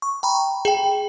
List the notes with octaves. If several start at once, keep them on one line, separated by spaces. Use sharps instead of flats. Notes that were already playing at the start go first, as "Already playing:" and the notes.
C#6
G5 A#5 B5
G#4 G5